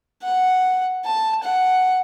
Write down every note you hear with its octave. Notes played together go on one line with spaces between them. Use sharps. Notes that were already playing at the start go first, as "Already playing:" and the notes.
F#5
A5
F#5